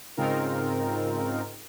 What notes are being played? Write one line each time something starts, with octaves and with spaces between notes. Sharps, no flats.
G#2 C#3 C4 D#4 F4 A#4